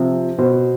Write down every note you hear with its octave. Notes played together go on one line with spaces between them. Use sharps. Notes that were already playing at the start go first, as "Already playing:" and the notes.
Already playing: C3 F3
B2 C5